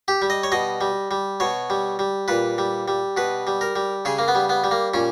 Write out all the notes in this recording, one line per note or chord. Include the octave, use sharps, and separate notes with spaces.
G4
G3
D#5
C#5
B2 D#5
G3
G3
B2 C#5
G3
G3
A#2 B4
G3
G3
B2 B4
G3
A#4
G3
C#3 G#4
A#3
B3
G3
B3
G3
A#3
A#2 C#4